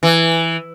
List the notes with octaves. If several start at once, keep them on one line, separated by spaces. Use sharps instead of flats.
E3